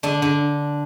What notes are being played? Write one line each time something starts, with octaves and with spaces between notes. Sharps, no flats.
D3 D4
D3